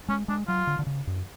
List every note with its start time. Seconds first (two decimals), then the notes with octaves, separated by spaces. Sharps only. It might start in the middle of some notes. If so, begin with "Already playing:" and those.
0.08 G#3 C#4
0.28 G#3 D4
0.47 F#3 F4
0.67 D3
0.79 D3
0.87 C#3
1.07 F#2